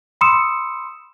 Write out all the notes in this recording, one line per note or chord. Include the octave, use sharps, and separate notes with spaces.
B5 C6 D#6 E6 C#7 E7